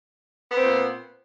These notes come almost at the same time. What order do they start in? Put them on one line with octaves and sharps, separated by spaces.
B3 C4 A#2